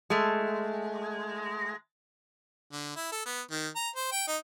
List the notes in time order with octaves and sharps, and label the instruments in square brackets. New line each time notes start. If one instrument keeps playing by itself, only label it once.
[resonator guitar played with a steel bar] G#3 A3
[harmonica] D3
E4
A4
B3
D#3
A#5
C5
G5
D#4